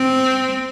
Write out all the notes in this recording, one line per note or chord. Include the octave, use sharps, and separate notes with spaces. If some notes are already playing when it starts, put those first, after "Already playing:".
Already playing: C4